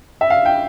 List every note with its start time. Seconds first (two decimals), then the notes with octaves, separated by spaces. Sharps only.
0.21 E5
0.30 F5
0.45 G5